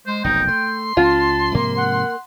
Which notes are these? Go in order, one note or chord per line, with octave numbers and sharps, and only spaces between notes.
G#3 C5
F1 B1 F#2 D#4 G5
A3 C6
C#2 C#4 F4 A5
G#2 C3 F3 A#3
F#5